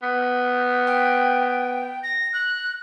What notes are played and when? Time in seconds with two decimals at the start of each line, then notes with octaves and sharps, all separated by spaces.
0.02 B3
0.87 G5
2.03 A#6
2.33 F#6